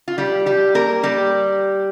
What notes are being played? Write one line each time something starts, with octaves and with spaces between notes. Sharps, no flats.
F4
G3 G4
G3 G4
A#3 A#4
G3 G4